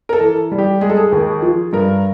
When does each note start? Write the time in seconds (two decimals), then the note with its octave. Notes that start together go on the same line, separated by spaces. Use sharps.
0.09 A#4
0.13 A4
0.21 E3
0.52 G3
0.58 G4
0.81 G#3 G#4
0.90 A4
0.97 G#4
1.12 D#2
1.42 F3
1.73 G2 A#4